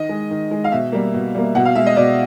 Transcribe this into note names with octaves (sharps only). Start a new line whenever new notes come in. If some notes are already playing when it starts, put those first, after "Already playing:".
Already playing: D#3 D#5
G#3
D#3
G#3
F5
B2 E5
G3 A#3
B2
G3 A#3
B2 F#5
F5
G#3 E5
D#5
B2 D5